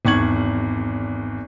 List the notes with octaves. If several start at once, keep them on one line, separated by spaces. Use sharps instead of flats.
G#1 E2 C#6 G#6 F#7